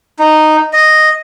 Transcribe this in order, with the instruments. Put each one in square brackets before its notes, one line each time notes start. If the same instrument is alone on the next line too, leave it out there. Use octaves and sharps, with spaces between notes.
[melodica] D#4
D#5